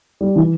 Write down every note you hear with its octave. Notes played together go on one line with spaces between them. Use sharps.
G3
E3